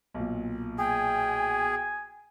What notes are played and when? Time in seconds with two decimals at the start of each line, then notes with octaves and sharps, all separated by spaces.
0.14 B1 A#2
0.79 G#4 G5 G#5